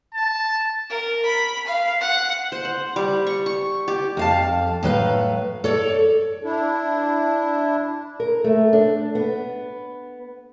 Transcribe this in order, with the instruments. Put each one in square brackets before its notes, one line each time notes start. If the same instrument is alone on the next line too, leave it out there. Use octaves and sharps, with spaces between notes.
[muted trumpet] A5
[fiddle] A#4
B5
F5
F#5
[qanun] C5
F#5
G3
C#6
C#6
G4
[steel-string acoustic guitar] F2 F5 A5
A2 F#3 B4 F5
A4 C#5 D5
[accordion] D4 E4
[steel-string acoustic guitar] A#4
A3
D4
B3